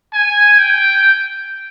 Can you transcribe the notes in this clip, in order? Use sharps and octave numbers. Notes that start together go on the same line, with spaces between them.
G#5
G5